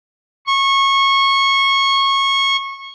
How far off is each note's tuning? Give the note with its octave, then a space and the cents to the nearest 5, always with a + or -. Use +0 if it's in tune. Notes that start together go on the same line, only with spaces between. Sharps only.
C#6 -20